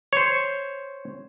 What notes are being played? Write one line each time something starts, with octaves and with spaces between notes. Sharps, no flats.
C5 C#5